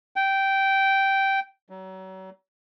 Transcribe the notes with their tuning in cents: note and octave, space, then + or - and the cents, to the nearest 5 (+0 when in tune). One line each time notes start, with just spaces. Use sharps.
G5 -10
F#3 +35